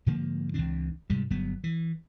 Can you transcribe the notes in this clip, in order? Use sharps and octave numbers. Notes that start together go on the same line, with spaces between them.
G#2 D3 F3 A#3
C#2 E3 C4 D4
G#2 C3 G3
G1 F#3 B3
E3